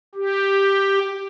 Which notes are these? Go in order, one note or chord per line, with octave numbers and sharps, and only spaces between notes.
G4